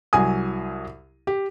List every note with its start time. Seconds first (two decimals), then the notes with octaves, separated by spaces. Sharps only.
0.13 C2 F#3 G#5 D#6
1.27 G4